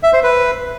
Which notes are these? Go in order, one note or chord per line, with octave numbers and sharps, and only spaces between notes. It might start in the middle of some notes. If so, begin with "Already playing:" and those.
E5
C5
B4